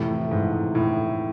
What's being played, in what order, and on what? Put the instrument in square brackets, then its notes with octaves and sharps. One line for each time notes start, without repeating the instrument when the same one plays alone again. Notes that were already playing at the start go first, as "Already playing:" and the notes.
Already playing: [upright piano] F2 C3 E3 A3 [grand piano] A2
[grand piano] G#2
A2